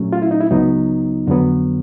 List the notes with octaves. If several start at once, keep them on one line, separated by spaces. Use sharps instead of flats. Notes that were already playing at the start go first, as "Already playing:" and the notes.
Already playing: A#2 F#3 A3 C#4
F4
E4
D#4
E4
C#2 C#3 F#3 B3 D#4
F2 D3 F#3 B3